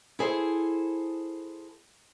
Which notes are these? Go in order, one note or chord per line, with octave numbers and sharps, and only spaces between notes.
E4 G#4 A4 C5